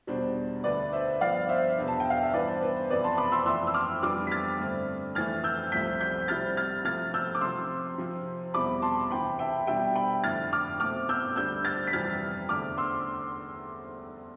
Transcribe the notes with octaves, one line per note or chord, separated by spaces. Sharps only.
E2 B2 G3 D4 C5
D2 D3 A3 B4 D5
C5 E5
G2 F3 B3 D5 F5
C5 E5
E2 B2 B3 D4
A5
G5
F5
E5
G2 E3 B3 B4 D5
C5
B4
C5
F2 C3 E3 B3 B4 D5
A5 C6
B5 D6
C6 E6
F2 E3 A3 E4 C6 E6
E6
D6 F6
F2 E3 G3 B3 D4 D6 F6
B6
F6 A6
G2 D3 A3 C4
F2 E3 A3 F6 A6
E6 G6
C2 C3 F3 A3 C4 G6 B6
G6 B6
C3 G3 C4 E4 F6 A6
F6 A6
C3 F3 A3 F6 A6
E6 G6
D6
C3 F3 C4 C6 E6
C3 F3 C4
E2 B2 G3 C4 E4 B5 D6
A5 C6
D2 C3 E3 G5 B5
E5 G5
B2 G3 D4 E5 G5
G5 B5
F2 D3 A3 E4 F6 A6
D6 F6
B2 A3 C4 D6 F6
E6 G6
D2 D3 G3 E6 G6
F6 A6
B6
F2 C3 E3 G3 F6 A6
E2 D3 A3 D6 F6
C6 E6